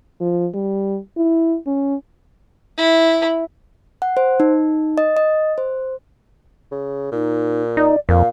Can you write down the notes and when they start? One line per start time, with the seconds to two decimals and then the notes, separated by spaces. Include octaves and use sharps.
0.20 F3
0.54 G3
1.17 E4
1.67 C#4
2.77 E4
4.02 F#5
4.17 C5
4.40 D#4
4.98 D#5
5.17 D#5
5.58 C5
6.72 C#3
7.12 A#2 D#4
7.77 D#4 D5
8.09 F2 A#2 F5